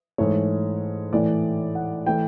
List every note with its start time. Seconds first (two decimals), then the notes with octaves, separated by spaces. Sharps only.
0.18 G#2 E3 A3 C#5
1.13 A2 E3 A3 D5
1.75 F#5
2.06 E3 A3 G5